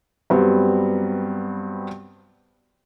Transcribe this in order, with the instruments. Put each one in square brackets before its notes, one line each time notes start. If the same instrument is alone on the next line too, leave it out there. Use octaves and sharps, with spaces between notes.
[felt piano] G2 F#3 G3 B3 C4